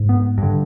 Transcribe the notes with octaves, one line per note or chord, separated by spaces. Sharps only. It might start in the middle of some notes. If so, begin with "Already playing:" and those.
Already playing: G#2
B3
G2 D3